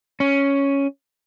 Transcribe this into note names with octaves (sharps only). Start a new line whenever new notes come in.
C#4